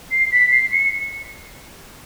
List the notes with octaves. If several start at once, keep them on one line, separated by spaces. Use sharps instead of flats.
C7
B6
C7
C#7